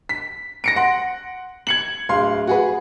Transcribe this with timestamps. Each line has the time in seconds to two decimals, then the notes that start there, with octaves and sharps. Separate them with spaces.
0.09 B6
0.64 A#6 C#7 D7
0.76 F#5 C6
1.67 G#6 C#7 F#7
2.09 D1 F5 C6
2.47 F#4 G#4 B4